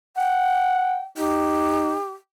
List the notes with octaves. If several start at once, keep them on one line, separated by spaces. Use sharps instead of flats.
F#5 G5
D#4 G4